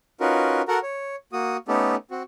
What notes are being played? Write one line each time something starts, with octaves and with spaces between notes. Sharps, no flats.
C#4 D#4 F4 F#4 A#4 B4
F#4 A4 A#4 F#5 A#5
C#5
A#3 F#4 D#6
A3 B3 C#4 D#4 G4 A4
C4 F#4